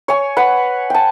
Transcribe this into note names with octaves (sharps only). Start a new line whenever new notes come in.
C#5 G#5
B4 F#5
G5 A5